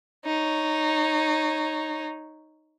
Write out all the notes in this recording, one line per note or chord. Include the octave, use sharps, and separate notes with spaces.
D#4 C#5